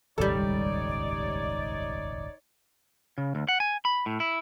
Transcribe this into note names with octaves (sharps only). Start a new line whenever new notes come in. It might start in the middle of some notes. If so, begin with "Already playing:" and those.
D#1 G#1 C#2 G3 D#4 A4 C#5 D5
C#3
D2
F#5
G#5
B5
A2
E4